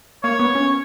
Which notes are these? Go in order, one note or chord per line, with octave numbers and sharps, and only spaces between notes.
A#3 C#5
B3
C#4